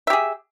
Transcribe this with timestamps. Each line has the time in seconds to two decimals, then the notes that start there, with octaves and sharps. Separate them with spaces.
0.07 E5
0.10 G4
0.13 G#4